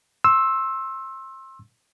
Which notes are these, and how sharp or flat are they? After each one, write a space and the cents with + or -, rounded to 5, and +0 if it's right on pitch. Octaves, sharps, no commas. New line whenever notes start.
C6 +30 E6 +0